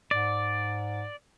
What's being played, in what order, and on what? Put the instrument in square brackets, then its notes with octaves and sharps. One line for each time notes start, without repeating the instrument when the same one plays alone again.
[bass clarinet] G#2 [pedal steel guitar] D5